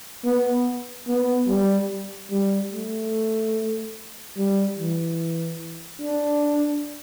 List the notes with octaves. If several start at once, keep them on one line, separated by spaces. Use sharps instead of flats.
B3
B3
G3
G3
A3
G3
E3
D4